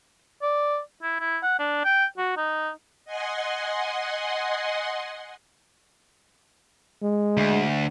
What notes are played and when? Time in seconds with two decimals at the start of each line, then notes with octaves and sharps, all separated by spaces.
0.42 D5
1.03 E4
1.20 E4
1.43 F#5
1.59 D4
1.84 G5
2.18 F#4
2.37 D#4
3.05 D#5 F#5 G#5 C6
7.02 G#3
7.37 D2